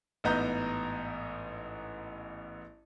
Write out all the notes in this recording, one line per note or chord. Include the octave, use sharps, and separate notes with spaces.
A1 G#2 B3 D#5 A#5 G6